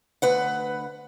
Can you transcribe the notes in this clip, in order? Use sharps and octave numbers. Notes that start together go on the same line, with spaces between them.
D2 B4 F#5